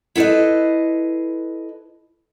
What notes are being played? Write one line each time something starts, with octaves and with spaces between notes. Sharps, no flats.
E4 A4 B4 C5 D#5